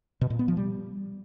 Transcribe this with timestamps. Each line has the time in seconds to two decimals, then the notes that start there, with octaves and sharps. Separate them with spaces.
0.21 B2
0.30 A#2
0.39 B3
0.48 F3
0.57 G3